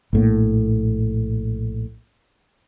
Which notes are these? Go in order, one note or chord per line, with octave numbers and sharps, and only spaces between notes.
A#1 A2 A#3